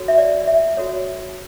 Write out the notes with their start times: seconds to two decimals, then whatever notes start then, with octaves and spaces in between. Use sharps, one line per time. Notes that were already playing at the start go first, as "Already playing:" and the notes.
Already playing: F#4 A4 C#5
0.08 E5
0.18 D5
0.48 E5
0.77 F#4 A4 C#5